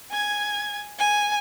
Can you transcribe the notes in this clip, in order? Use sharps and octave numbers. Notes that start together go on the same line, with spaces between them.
G#5 G#6
G#5